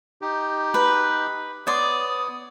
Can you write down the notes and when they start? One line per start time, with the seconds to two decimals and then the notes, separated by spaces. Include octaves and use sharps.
0.22 D#4 G4
0.74 B4
1.67 B3 C#5 D5 C6 D#6